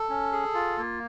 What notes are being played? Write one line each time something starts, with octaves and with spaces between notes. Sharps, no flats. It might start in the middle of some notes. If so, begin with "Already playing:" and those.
Already playing: A4
C#4
G#4
F4
A#3